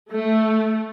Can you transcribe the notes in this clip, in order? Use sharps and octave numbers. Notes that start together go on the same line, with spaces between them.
A3